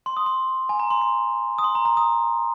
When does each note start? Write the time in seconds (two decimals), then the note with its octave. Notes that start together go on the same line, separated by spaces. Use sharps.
0.06 C6
0.17 D#6
0.26 C6
0.69 G#5
0.80 A#5
0.90 C6
1.01 C6
1.58 D#6
1.64 C6
1.75 A#5
1.85 A#5
1.97 D#6